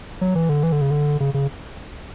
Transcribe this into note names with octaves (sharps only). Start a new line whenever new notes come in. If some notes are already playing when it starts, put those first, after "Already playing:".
F#3
E3
D3
E3
D3
C#3
D3
C#3
C#3